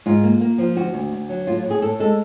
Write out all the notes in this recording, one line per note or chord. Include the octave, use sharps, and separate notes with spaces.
G#2 F4
A#3
A#3
F3
D2 F#4
D2
D2
F#3
A2 F4
A2
G#4
A2 A4
G#3 A4